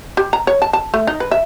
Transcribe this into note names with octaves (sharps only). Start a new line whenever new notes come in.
G4
A#5
C#5
A5
A5
A3
D#4
B4
E5